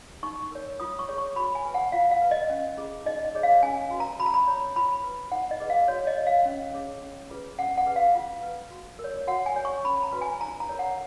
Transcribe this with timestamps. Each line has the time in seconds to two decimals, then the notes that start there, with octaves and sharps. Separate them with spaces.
0.23 D#4 C#6
0.52 A#4 C#5
0.80 F4 D#6
0.99 C#6
1.08 G#4 C#5
1.18 C#6
1.36 F#4 B5
1.55 G#5
1.65 B4
1.74 F#5
1.92 F4 F5
2.11 F5
2.21 B4
2.31 D#5
2.50 C#4
2.77 F4 G#4
3.05 D#4 D#5
3.25 D#5
3.35 G#4 C#5
3.43 F5
3.63 C#4 G#5
3.91 F#4 B4
4.00 A#5
4.19 F#4 B5
4.26 A#5
4.34 B5
4.47 C#5
4.76 F4 B5
5.04 B4
5.32 D#4 F#5
5.51 D#5
5.60 G#4 B4
5.70 F5
5.88 F#4 C#5
6.07 D#5
6.17 C#5
6.27 F5
6.45 C#4
6.74 G#4 C#5
7.02 C#4
7.30 F4 G#4 B4
7.59 C#4 F#5
7.78 F#5
7.86 G#4 B4
7.96 F5
8.15 F4
8.43 B4
8.71 F#4
8.99 A#4
9.04 C#5
9.27 F#4 F#5
9.46 G#5
9.56 C#5
9.65 C#6
9.85 C#4 B5
10.03 A#5
10.12 F#4 B4
10.21 G#5
10.41 D#4 A#5
10.60 A#5
10.69 A#4 C#5
10.79 F#5